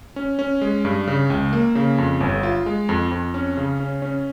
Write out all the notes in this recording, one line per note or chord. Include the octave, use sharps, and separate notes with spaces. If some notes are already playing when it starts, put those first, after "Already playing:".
C#4
C#4
G#3
G2
C#3
C#2
A#3
C#3
F2
G1
F4
G#3
F2
F2
C#4
C#3
C#4
C#4